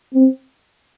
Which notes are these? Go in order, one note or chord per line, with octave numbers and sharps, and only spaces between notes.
C4